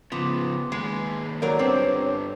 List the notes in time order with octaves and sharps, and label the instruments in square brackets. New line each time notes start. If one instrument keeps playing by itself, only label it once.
[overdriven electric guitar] C#3 F3 [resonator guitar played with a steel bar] B3 [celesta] C6 D6 E7
[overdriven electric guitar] D#2 B4 [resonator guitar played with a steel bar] G#3
[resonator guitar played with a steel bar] F#3 A#4 D5 [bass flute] C#5
[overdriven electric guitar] G2 D3 [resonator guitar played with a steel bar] C4 [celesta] B4 C5 D6